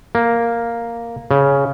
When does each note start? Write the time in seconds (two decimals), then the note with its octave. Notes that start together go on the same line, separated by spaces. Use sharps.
0.15 A#3
1.31 C#3